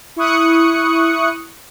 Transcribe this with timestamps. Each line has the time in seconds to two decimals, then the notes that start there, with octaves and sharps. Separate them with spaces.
0.16 E4 C#6 D#6 F#6 C#7